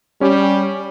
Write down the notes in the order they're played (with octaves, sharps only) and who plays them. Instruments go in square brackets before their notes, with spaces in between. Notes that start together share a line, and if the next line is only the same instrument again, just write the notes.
[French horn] G3 [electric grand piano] C#4 G4